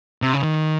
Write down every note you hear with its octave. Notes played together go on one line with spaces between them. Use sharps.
C3
C#3
D#3